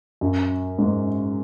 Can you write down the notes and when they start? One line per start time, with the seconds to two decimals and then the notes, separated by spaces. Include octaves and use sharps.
0.21 F#2
0.78 G#2